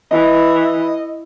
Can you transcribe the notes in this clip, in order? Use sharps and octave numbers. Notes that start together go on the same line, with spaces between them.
E3 D#5